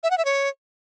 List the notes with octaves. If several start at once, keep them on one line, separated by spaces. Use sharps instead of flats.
E5
F#5
E5
C#5